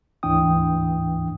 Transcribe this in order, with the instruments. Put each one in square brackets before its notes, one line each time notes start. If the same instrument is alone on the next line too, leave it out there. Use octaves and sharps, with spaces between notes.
[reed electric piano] D2 G#2 E3 D4 G5 D#6